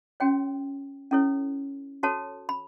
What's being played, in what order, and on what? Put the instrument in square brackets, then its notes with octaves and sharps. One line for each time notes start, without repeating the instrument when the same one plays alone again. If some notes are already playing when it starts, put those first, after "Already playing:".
[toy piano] C#4 F#4 C#5 G5
C#4 E4 A4 C#5
F#4 A4 C#5 A5
B5